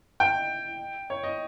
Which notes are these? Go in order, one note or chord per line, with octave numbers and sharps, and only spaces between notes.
G5
C#5
D#5